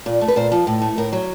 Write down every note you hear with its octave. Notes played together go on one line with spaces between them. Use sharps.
A#2
A3
B4
A#2 C5
F3
A2
A3
A2 A#4
F#3